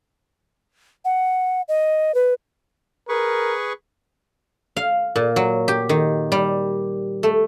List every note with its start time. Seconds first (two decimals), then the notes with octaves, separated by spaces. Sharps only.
1.05 F#5
1.68 D#5
2.15 B4
3.09 G#4 A#4 B4 C#6
4.77 F5
5.16 A#2
5.36 F#3
5.68 G4
5.89 D#3
6.32 G3
7.23 A3